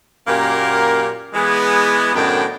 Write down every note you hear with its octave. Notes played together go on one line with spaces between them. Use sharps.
F#2 A#2 A#3 G4 A#4
E3 G#3 B3
F#2 A2 D#3 B3 D4 G5